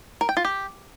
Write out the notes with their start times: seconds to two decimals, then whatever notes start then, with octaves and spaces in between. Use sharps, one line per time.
0.21 A#4
0.29 G5
0.37 F4
0.45 G4